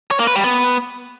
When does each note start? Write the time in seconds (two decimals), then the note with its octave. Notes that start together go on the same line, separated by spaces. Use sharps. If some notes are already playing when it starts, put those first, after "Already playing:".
0.11 C#5
0.19 A#3
0.27 B4
0.36 G3
0.44 B3